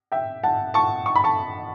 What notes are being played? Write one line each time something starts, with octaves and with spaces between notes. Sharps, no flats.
E5 G5
F#5 A5
A5 C#6
C#6
B5
A5 C#6